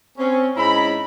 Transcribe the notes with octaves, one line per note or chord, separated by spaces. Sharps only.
C4 C#4
G#2 C#4 D#4 E4 A#5 B5